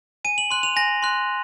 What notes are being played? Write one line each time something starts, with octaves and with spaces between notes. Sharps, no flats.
G#5 D#7
F#7
C6 F#6 F#7
F7
G#5 A#6
C6 F#6